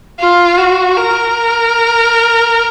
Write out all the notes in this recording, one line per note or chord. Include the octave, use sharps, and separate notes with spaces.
F4
F#4
A#4